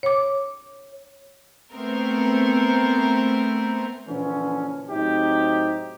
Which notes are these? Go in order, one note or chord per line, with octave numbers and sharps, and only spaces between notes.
C#5 D6
A3 B3 C4 A#4
A#2 D3 E3 F3 C#4
A2 C3 F#3 C4 D#4 G4